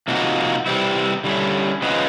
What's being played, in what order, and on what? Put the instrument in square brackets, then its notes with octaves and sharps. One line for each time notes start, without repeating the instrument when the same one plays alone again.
[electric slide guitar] C3 F3 A#3 D#4 F#4
C3 E3 G3 C4 E4
D3 G3 A#3 C#4 E4
C#3 F3 G#3 B3